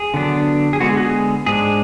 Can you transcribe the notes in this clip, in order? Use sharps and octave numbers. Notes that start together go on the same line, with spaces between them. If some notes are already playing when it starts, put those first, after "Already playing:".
Already playing: G#4
D3 F#3 B3 D4
G#4
D3 G#3 B3 F#4
G#4
F#4
G#4
G#2 G#3 D4 G#4